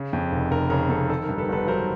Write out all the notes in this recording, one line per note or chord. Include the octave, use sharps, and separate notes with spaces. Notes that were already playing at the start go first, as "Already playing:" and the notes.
Already playing: C#3
F2
F1
F1 A#4
C#3 A#4
F2 A4
D#3 A4
G2 A#4
A4 B4
G1 A4 B4
F#3 A#4 C5